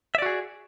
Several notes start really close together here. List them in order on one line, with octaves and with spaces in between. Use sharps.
E5 D5 F#4 G#4